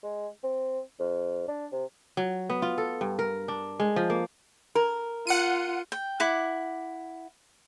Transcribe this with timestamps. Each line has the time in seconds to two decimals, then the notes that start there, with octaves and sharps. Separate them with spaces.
0.04 G#3
0.43 C4
0.99 F2
1.48 D4
1.72 C3
2.17 F#3
2.50 B3
2.62 F4
2.78 A4
3.01 G2
3.19 A#4
3.48 D4
3.80 G#3
3.96 F3
4.10 A#3
4.75 A#4
5.27 F4 F#5 C#7 D#7
5.92 G5
6.20 E4 F#5 D6